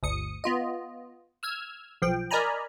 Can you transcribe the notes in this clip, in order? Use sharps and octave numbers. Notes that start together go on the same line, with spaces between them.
G1 D2 D#6 C#7
B3 F4 D#5
E6 F6 G#6
B1 F3 G5
A#4 D5 D#5 G#5 A#5 B5